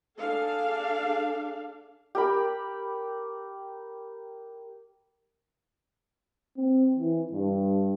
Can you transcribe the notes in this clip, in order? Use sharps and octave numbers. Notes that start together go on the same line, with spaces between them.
D4 G#4 A4 F5
G4 A#4 B5
C4
E3
G2